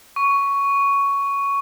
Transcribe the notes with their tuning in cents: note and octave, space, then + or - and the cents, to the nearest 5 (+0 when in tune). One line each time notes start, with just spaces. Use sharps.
C#6 +10